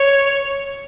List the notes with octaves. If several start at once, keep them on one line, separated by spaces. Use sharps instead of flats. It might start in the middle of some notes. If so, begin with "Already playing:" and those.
Already playing: C#5